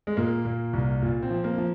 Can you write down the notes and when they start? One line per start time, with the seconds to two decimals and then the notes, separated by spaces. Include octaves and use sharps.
0.07 G#3
0.17 A#2 A#3
0.45 A#2
0.73 C2
1.02 A#2
1.22 C4
1.31 F3
1.44 A#3
1.58 F3